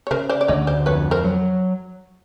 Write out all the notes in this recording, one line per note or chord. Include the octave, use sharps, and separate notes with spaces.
C#5
C#3 A#4 C5
C5 D5
D5
D2 C#5 D#5
C5 D5
F2 B4 C#5
A#4 C5
F#3